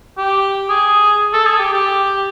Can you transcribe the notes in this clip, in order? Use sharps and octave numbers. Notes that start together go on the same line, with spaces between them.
G4
G#4
A4
G#4
G4
G4